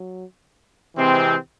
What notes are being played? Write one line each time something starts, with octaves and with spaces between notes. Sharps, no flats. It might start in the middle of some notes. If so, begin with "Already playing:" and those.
Already playing: F#3
C3 E3 G#3 C4